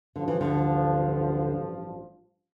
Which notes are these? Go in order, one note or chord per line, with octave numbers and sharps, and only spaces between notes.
A1 G2 D3 F3
E3
D2 D3